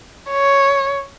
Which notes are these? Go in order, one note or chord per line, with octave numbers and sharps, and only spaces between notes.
C#5